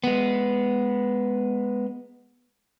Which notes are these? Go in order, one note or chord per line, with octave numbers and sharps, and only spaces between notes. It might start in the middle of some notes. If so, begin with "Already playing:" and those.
G#3 B3